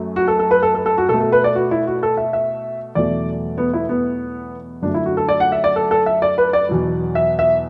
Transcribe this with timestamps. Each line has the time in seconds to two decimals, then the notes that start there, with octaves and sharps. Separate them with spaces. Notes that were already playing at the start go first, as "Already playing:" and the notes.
Already playing: F#2 A3
0.16 F#4
0.28 A4
0.39 A4
0.51 B4
0.62 A4
0.75 A4
0.86 A4
0.98 F#4
1.09 B2 A3 A4
1.21 A4
1.32 B4
1.44 D5
1.55 F#4
1.71 E4
1.87 F#4
2.03 A4
2.17 E5
2.33 E5
2.95 E2 B2 F#3 A3 D5
3.58 B3
3.73 E4
3.89 B3
4.82 F#2 D3 A3 D4
4.94 E4
5.06 F#4
5.17 A4
5.29 D5
5.40 F#5
5.52 E5
5.64 D5
5.76 A4
5.91 A4
6.06 E5
6.22 D5
6.38 B4
6.53 D5
6.69 E2 B2 F#3
7.15 E5
7.39 E5